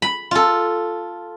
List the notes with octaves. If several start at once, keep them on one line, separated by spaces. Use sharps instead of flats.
B5
F4 A4